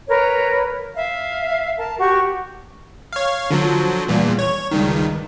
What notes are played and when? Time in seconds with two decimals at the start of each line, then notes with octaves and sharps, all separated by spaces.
0.08 A#4 B4 C#5
0.95 E5 F5
1.76 A#4 A5
1.99 F#4 G4 C#6
3.13 C#5 F5
3.51 D3 F3 F#3
4.08 E2 G2 A#2
4.39 C#5
4.71 C#2 G2 D#3